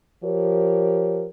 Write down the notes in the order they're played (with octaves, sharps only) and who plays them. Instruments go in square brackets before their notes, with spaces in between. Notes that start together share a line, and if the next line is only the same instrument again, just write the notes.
[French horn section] F3 G4 A#4 C#5